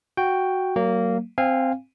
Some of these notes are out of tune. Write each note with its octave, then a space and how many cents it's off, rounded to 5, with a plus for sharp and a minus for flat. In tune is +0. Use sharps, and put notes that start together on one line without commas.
F#4 +0 G5 +0
F#3 +25 A#3 -15
C4 +0 F5 -10 G#5 -25